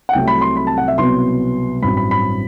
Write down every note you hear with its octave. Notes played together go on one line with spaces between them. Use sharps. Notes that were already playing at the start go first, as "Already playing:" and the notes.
F#5
C2 C3 F#3 A3 G5
B5
C6
B5
A5
F#5
E5
C2 B2 F#3 B3 C6
A1 G2 F#3 C4 B5
B5
B5